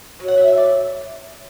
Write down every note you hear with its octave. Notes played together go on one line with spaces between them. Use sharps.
A2 F#3
F#5
E5
E5
D5